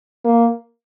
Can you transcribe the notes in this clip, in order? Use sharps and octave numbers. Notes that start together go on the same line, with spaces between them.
A#3